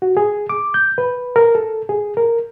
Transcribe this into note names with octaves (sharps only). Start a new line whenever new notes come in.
F#4
G#4
D6
G6
B4
A#4
A4
G#4
A#4